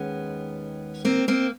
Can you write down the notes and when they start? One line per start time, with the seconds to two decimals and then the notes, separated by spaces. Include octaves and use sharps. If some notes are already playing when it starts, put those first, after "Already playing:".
Already playing: D#2 D#3 G#3 B3 C#4
1.05 A#3 C4
1.28 A#3 C4